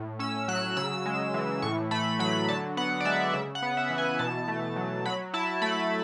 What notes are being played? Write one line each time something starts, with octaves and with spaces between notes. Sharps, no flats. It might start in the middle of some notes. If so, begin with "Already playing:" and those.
Already playing: A2
C#4 E6
F#3 F#6
C#3 E6
G#3
E3
A2 C#6
A3 B5
F#3 B5
D3 A5
B3 F#5
D5
G#3 E5
C#3 E5
F#5
B3
E5
E3
G#5
B2 A5
A3
F#3
F#3 B5
E4 A5
A3 B5